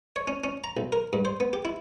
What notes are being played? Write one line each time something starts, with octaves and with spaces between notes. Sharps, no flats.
C#5
C#4
C#4
A#5
B1
A#4
G2
C5
B3
G4
E4